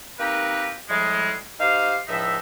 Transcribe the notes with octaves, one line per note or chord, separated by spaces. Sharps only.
A#3 C4 D#4 G4 A#4 B4
A2 F3 G3 G#3
D#4 G4 C5 F5
C#2 A2 F3 D#4 E5